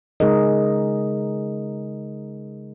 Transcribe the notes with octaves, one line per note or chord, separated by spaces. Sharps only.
C#3 G#3 D#4 G#4 A#4 D#5